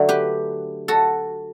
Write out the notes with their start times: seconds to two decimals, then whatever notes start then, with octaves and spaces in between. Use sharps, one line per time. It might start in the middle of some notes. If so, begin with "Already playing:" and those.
Already playing: D3 F#3 A3
0.09 G4 B4
0.88 F#4 A4